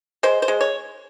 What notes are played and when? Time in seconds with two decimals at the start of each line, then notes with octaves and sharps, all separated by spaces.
0.23 G#3 C5
0.42 C5
0.48 G#3
0.61 C#5